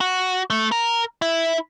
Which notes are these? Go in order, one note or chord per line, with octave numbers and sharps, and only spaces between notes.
F#4
A3
A#4
E4